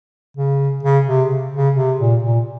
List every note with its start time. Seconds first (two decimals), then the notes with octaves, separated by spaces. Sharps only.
0.37 C#3
0.83 C#3
1.07 C3
1.30 C3
1.54 C#3
1.76 C3
1.99 A#2
2.23 A#2